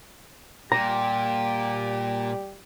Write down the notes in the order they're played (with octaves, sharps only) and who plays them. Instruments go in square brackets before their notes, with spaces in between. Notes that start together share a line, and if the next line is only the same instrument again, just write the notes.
[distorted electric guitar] A#2 [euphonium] G3 [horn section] G4 [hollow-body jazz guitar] A#5